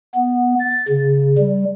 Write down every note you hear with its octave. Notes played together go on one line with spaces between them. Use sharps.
B3
A6
C#3
G3